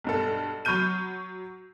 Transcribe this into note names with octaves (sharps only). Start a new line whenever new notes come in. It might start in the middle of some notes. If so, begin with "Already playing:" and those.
B1 G2 A4
F#3 B5 C#6 F6 G6 D#7